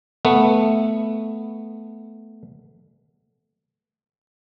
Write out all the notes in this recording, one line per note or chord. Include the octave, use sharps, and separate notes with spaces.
A3 B3